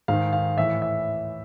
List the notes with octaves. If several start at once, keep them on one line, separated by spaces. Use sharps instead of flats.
G#2 D#3 F5
F5
A2 E3 E5
E5